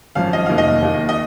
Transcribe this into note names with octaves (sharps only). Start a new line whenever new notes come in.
G#1 F#2 F3 F5
D#5
F1 D#2 D#3 A#3 F5
D#5
D#2 D#3 A#3
D#5